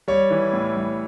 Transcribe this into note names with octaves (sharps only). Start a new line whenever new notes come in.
G3 C#5
E3
A2
A2